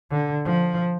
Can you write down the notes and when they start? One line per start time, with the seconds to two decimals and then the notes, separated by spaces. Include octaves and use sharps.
0.11 D3
0.45 F3